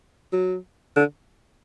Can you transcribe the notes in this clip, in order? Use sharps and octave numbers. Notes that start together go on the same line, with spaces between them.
F#3
D3